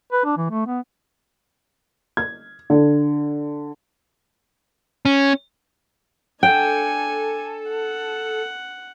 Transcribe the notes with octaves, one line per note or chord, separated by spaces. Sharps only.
B4
D4
E3
A3
B3
G#6
D3
C#4
D4 A4 G5 G#5
F#5